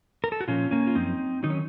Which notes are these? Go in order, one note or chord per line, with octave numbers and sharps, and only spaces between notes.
A#4
A4
F#4
A#2 F3 C#4 F4
A#3 C#4
F4
F#2 F3 C4 D#4
D#3 F#3 D#4
C#4